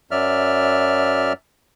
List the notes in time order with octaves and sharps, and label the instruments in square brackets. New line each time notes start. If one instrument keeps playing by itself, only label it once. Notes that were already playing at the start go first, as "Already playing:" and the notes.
[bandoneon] F#2 F#3 D5 E5 F6